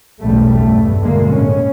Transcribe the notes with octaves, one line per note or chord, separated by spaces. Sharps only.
B1 E2 G2 C#3 G3 A3
G2 A3
B2 D3 G#3 A#3
A2 C#4